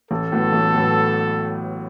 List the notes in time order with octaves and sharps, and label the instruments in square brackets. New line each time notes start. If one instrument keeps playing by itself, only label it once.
[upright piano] A1 [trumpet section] A4
[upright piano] A2 F#3 B3
A1
A2 F#3 B3